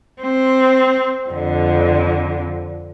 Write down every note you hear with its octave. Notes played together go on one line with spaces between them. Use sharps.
C4
F2 D3